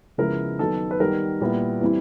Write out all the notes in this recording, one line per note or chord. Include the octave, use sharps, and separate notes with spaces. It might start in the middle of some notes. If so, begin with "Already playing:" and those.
C#3 F3 G#3 B3 E4 A#4
D#3 F#3 B3 A4
B4
D#3 G3 B3 A#4
A#2 G3 B3 E4
E3 G3 C4 E4